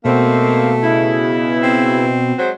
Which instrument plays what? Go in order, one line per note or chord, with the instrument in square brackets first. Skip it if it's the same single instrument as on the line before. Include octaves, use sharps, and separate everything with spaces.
[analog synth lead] B2 [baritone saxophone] A3 [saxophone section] A#3 C4
[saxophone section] C#3 E4
[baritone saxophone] C4
[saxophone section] F#3 G#3 C5